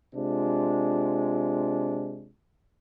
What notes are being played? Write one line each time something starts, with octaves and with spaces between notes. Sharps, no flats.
C3 G#3 D4 F4